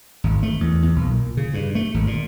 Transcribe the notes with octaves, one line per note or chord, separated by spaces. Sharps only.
G#1
A3
E2
E2
B1
A#2
C#3
G2
A3
G#1
A#2